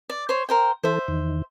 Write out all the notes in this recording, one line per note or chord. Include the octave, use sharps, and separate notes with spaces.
D5
C5 C#5
A#4 C5 G5
E3 A4 C5 E5
E2 D#3